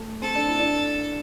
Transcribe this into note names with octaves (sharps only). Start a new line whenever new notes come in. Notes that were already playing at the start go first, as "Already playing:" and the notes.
Already playing: A3
C4 A4
D4
E4
D4